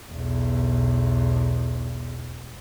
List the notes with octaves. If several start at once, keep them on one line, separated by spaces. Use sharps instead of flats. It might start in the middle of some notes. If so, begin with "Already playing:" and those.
B1 E2